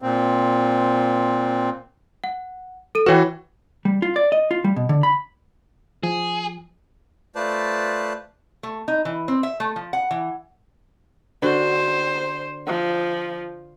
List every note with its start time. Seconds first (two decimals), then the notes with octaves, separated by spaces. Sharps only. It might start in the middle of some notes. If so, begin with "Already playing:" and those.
0.02 A#2 C4
2.24 F#5
2.95 A4 D#7
3.06 E3 F#4 B4 C#5 G5
3.85 G3
4.02 F4
4.16 D5
4.32 D#5
4.51 F4
4.64 G3
4.76 B2
4.89 D3
5.03 B5
6.03 F3 G#4
7.35 A3 F4 B4 C5 D5 A5
8.63 A3
8.88 D#4
9.05 E3
9.28 C4
9.43 E5
9.60 A3
9.76 F3
9.93 F#5
10.11 E3
11.42 D3 F#4 C5
12.67 F3